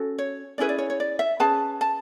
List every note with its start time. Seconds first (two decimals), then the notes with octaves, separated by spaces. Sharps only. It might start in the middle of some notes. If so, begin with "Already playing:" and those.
Already playing: C#4 F#4 A4
0.18 C#5
0.58 C#4 E4 G#4 B4 D5
0.69 D5
0.78 C#5
0.90 C#5
1.00 D5
1.19 E5
1.40 C#4 G#4 B4 A5
1.81 A5